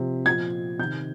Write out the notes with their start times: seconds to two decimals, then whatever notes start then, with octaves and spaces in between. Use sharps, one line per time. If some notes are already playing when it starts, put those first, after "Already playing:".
Already playing: C3 F3
0.26 A#2 F3 G#6
0.79 C3 D#3 G6